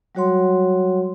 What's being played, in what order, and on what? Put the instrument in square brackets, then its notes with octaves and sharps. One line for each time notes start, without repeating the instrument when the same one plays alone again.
[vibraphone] F#3 G3 F#4 C#5 F#5 C6